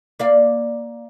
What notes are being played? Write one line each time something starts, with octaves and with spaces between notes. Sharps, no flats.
A#3 D5 F5